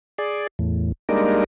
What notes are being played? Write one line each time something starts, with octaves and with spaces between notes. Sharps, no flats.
G#4 D5
E2 A2
G3 G#3 A#3 D4 D#4 A#4